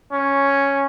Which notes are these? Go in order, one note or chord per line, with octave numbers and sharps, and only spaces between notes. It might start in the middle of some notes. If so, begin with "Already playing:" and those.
C#4